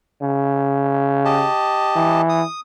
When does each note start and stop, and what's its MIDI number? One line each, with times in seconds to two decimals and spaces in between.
0.22 1.47 49
1.25 2.22 67
1.25 2.22 75
1.25 2.22 81
1.95 2.42 52
2.29 2.60 87